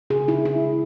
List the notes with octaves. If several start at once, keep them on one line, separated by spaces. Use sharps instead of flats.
C#3 G#4
E4
C#3
E4
G#3